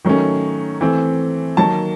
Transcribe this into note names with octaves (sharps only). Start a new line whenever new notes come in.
D#3 F#3 A3 C#4
E3 A3 C4
D#3 F#3 A#3 A5